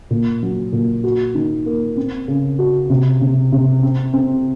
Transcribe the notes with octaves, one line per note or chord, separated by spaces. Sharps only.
A#2
F#3
A#2
F#4
D#3
A#3
C4
C#3
F#4
C3
C3
C3
C4
C4